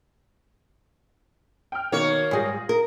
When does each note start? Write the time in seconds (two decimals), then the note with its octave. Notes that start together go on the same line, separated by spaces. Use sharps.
1.72 G5 F6
1.92 B2 D#3 A#3 C#5
2.31 G#2 G3 F4 G#4 A#6
2.69 A#4